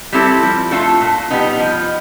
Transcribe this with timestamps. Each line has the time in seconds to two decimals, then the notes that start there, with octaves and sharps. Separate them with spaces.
0.13 G3 C4 E4 A4
0.43 F3
0.71 A3 D4 F4 A4
1.01 A#2
1.30 G3 B3 D#4
1.60 F3